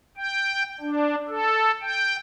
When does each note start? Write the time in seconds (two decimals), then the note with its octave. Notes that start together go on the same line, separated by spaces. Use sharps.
0.17 G5
0.80 D4
1.28 A4
1.82 G5